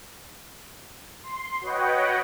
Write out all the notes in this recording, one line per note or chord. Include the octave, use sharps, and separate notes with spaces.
C6
F#4 B4 C#5 D#5 F#5 G5